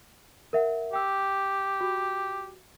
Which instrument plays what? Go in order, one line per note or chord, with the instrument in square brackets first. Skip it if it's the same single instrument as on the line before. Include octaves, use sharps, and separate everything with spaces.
[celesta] A#4 E5 F#5
[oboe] G4 [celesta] G5 E6
[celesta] F#4